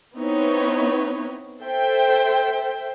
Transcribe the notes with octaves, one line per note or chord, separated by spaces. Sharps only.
B3 C4 D#4 E4 B4 C#5
A4 C5 E5 G5